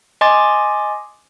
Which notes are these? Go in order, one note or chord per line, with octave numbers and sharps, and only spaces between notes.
D#5 G#5 C6 D6 A6